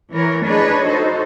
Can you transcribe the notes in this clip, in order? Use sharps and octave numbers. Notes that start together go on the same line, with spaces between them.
E3 A#4 C#5
D4 G#4 B4 C#5 D#5
D#4 F#4 A4 C5